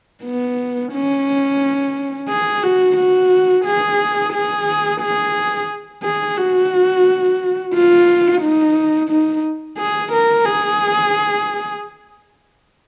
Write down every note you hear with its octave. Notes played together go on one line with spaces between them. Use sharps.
B3
C#4
G#4
F#4
F#4
G#4
G#4
G#4
G#4
F#4
F4
D#4
D#4
G#4
A#4
G#4